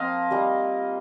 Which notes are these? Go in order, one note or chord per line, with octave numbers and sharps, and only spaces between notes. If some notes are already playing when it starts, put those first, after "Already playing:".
Already playing: F3 A#3 C4 F4 D#5 F5
G3 A#3 D#4